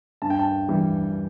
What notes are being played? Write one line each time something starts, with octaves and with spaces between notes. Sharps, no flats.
G2 A5
G5
A5
E3 G3